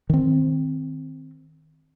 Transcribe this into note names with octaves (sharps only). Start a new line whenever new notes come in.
D#3 C4